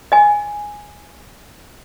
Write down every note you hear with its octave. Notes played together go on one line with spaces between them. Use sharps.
D#5 G#5